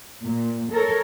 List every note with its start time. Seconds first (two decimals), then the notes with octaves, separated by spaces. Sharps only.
0.25 A#2
0.72 A4 A#4 C#5